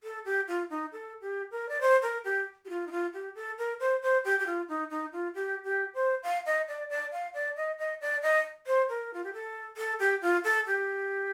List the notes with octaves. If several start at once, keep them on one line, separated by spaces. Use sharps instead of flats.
A4
G4
F4
D#4
A4
G4
A#4
D5
C5
A#4
G4
G4
F4
D#4
F4
G4
A4
A#4
C5
C5
G4
G4
F4
D#4
D#4
F4
G4
G4
C5
F5
D#5
D5
D5
F5
D5
D#5
D#5
D5
D#5
C5
A#4
F4
G4
A4
A4
G4
F4
A4
G4